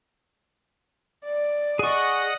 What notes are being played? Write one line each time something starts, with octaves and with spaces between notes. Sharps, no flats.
D5
G#4 D#5 F#5 C#6